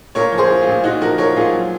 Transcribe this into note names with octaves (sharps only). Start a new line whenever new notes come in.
A#2 A#4 C#5
F3
G#4 C5
F3
F4 G#4
A#2
A#2 D#4 F#4
F3 F#4 A#4
F3 A#4 C#5
A#2 F4 G#4
F#3